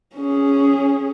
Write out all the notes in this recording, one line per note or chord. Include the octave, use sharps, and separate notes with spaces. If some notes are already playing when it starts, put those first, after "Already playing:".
C#4 G#4